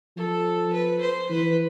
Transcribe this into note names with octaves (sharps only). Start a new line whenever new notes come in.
F3 A4
B4
C5
E3 B4